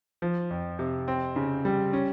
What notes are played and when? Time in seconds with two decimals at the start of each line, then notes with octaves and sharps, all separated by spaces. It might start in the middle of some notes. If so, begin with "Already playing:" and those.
0.22 F3
0.51 F2
0.79 C3
1.08 C4
1.36 C#3
1.65 G3
1.93 C#4